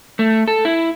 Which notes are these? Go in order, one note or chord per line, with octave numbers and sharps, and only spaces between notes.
A3
A4
E4